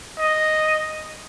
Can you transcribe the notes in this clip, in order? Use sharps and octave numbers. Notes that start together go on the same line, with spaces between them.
D#5